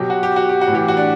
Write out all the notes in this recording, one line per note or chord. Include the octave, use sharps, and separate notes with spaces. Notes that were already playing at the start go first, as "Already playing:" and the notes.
Already playing: B2 F#3 G4
F#4
G4
F#4
G4
F#4
A2
E3 G4
F#4
D4